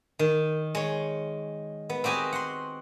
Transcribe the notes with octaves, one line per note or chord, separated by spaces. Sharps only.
D#3
G#3 C#5
B3
C4 F#4 G4 D#5 G#5
F#5 C6